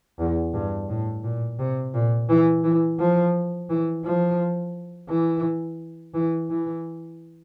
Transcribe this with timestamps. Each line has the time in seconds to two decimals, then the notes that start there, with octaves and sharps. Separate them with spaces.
0.19 E2
0.54 G2
0.89 A2
1.24 A#2
1.59 C3
1.94 A#2
2.29 E3
2.64 E3
2.99 F3
3.70 E3
4.04 F3
5.09 E3
6.14 E3
6.50 E3